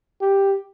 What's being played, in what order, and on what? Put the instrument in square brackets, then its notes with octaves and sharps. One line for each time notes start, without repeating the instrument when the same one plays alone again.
[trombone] G4